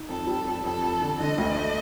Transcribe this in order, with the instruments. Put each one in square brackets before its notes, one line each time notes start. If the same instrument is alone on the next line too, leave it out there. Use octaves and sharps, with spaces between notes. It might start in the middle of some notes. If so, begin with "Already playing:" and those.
Already playing: [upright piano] D#4
[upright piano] F2 [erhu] A4
[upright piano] G3
F2
[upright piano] F2 [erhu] A4
[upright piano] F2
D3
[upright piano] D3 [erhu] D#5
[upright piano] D2
A3